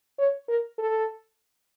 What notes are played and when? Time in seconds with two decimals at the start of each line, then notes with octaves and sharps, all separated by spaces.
0.19 C#5
0.49 A#4
0.79 A4